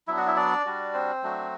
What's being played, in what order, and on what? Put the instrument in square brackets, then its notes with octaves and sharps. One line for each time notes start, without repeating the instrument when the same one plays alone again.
[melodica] F#3 B3 D4 E4 E5
F#4 F#5
E4 E5
D4 D5
G3 D4 F#4
C4 C5
F#3 A3 D4 F#4